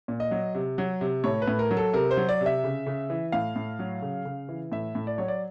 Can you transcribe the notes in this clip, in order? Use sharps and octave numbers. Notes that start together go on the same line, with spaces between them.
A#2
D#5
F#3
C3
F#3
C3
A2 C#5
B4
A2
A#4
F#3
A4
C3 A#4
C5
F#3
D5
C3
E5
C#3
C#3
E3
A2 F5
A2
F#3
C#3
C#3
E3
A2 E5
A2
D5
F#3 C#5
D5